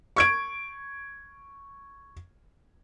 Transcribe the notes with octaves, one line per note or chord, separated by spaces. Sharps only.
C#6 G#6 D7